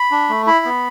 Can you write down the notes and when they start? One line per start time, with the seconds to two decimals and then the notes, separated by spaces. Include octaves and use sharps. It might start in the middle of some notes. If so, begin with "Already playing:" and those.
Already playing: B5
0.11 D4
0.29 A3
0.47 E4 B5
0.65 B3